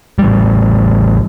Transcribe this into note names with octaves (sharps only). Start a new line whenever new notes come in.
A1 G3